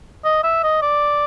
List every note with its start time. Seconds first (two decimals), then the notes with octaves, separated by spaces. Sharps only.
0.25 D#5
0.44 E5
0.64 D#5
0.82 D5